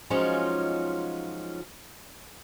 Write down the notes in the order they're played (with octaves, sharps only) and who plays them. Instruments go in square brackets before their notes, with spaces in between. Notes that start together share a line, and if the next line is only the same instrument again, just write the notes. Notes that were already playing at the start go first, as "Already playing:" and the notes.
[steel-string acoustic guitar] F3 F#3 G#3 C#4 D#4 F4